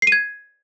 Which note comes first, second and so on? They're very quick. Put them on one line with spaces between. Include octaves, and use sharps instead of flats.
C7 D#7 G#6